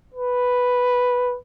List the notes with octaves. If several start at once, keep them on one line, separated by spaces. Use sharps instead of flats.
B4